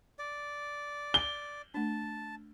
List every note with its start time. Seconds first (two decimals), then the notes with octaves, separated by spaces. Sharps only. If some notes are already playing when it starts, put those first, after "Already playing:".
0.19 D5
1.14 G7
1.74 A3 D4 A5